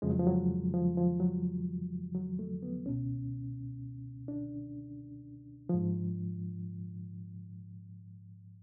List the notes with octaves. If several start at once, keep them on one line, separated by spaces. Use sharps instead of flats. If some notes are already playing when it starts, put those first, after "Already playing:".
F2 C#3 F3 G#3
F#3
F3
F#3
F3
F3
F#3
F#3
A3
B3
C#2 B2 C#4
D4
G#2 F3